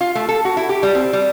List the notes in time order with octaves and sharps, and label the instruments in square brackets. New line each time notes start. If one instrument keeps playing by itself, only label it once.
[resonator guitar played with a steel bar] F4
A3
A4
F#4
E4
G4
G3
C4
G3